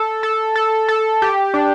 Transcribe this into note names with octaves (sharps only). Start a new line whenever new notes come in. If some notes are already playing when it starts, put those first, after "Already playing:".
Already playing: A4
A4
A4
A4
G4
D4